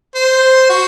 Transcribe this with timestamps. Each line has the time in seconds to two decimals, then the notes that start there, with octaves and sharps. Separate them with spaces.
0.15 C5
0.69 F#4